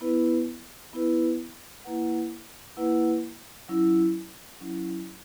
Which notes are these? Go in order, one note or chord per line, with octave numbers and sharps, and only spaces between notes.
B3 E4 B4
B3 E4 B4
A#3 E4 B4 F#5
A#3 E4 B4 F#5
F#3 C#4 E4
F#3 C#4 E4